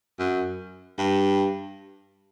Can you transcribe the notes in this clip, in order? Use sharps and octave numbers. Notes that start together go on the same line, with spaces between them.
F#2
G2